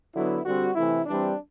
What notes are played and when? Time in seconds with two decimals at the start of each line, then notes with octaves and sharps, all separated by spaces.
0.14 D3 F#3 B3 E4
0.44 D3 G3 C4 F#4
0.75 C3 E3 A3 E4
1.06 E3 G3 C4 D4